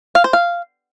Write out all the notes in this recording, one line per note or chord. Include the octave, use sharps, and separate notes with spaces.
F5
C5
F5